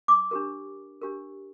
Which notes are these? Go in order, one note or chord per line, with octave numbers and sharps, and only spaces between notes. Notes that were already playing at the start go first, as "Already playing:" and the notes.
D6
D4 G4 A#4
D4 G4 A#4